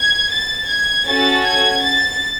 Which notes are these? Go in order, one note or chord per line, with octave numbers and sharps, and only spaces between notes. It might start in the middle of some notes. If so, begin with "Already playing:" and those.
Already playing: G#6
A6
G#6
C#4 F#4 A4 A6
G#6
A6